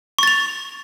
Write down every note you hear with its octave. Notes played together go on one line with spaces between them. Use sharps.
C#6 A6 F7